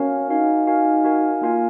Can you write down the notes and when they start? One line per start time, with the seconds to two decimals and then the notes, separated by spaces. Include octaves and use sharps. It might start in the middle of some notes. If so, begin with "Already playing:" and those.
Already playing: C#4 F#4 A#4 F5 G#5
0.29 D#4 F#4 A#4 F5 G#5
0.67 F#4 A#4 F5 G#5
1.04 F#4 A#4 F5 G#5
1.41 A#3 F4 A#4 F5 G#5